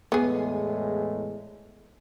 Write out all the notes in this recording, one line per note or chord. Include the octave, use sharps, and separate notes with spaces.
E2 A2 G#3 B3 G#4